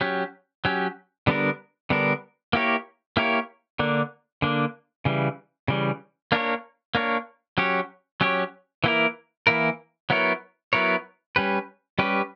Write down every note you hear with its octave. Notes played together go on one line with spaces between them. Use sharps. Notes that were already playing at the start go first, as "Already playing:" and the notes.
F#3 C#4 G4
F#3 C#4 G4
D3 G3 B3 D4 A#4
D3 G3 B3 D4 A#4
A#3 E4 G4 A#4 C#5
A#3 E4 G4 A#4 C#5
D3 A#3 D4
D3 A#3 D4
C#3 E3 G3
C#3 E3 G3
A#3 D4 A#4 C#5
A#3 D4 A#4 C#5
F#3 C#4 G4 C#5
F#3 C#4 G4 C#5
E3 A#3 E4 A#4
E3 A#3 E4 A#4
F#3 B3 E4 A#4 C#5
F#3 B3 E4 A#4 C#5
G3 C#4 G4 B4
G3 C#4 G4 B4